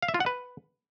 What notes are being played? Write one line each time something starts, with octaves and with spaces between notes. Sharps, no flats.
F5
E5
F4
F#5
B4